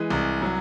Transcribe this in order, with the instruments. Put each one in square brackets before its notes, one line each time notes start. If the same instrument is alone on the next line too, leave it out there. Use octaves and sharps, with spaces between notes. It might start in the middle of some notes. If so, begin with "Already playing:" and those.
Already playing: [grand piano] E3 G#3
C2
F#3